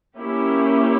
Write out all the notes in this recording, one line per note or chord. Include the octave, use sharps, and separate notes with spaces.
A#3 C#4 E4 G4